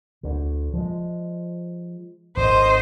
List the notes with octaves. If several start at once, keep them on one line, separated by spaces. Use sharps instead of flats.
D2 D3
F3 G#3
G#1 D3 C5 D#5